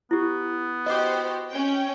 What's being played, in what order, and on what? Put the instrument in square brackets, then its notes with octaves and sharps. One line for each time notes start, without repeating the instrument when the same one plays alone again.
[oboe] B3 [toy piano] E4 G4
[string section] F#4 G4 C5 [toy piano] D#5 D6
[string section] C#4 G5